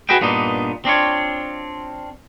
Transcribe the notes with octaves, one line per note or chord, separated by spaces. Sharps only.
F#4 G#4 B4 D#5 G5
G2 A#2 B3 D4 D#4
C4 D4 F4 C#5